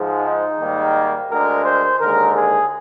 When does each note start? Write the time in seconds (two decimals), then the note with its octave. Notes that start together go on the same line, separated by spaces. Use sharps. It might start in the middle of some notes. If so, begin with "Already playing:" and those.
Already playing: G#2 F3 G#3
0.26 D#4
0.61 G#2 D#3 G3 A#3
1.31 D2 D3 G#3 A#4
1.66 C5
2.00 D#2 D3 G#3 A#4
2.36 G#4